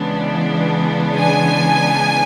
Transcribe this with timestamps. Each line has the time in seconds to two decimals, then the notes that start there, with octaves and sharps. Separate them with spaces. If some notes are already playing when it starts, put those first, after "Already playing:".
Already playing: C#3 E3 G#3 B3 D4
1.20 G#5